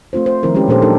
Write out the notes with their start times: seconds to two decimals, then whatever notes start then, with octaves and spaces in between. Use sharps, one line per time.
0.13 A3 C4 F4 C5
0.26 C5
0.43 D#3 F3 C4 E4 A#4
0.55 G#3 C#4 E4 G4 B4
0.68 A#2 F3 D4 G4 A4 C5
0.82 F#3 D4 D#4 G4 A4 A#4